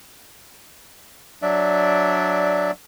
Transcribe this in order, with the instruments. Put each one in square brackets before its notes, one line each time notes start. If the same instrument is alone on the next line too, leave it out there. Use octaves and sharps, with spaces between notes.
[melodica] F#3 D4 D5 E5